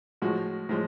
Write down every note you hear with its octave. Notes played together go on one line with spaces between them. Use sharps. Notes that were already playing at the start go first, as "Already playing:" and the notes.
A2 F3 G#3 F#4
A2 F3 G#3